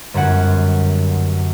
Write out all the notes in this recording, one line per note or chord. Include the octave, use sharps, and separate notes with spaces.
G1 F#2 C#4 F#5